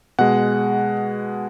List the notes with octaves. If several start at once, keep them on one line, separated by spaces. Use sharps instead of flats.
B2 G#3 F#5